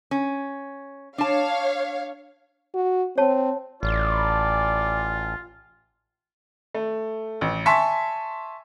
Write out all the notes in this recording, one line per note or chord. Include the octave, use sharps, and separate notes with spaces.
C#4
D4 C#5 F5 A5
F#4
C4 C#5 A5
A1 F4 D5
A3
A1
E5 G#5 A5 C6 C#6 B6